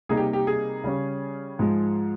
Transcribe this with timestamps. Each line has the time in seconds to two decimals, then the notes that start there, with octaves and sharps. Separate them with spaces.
0.09 C3 G3 A#3 D#4 G#4
0.17 G4
0.33 G4
0.47 G#4
0.84 C#3 G3 C#4
1.59 G#2 F3 G#3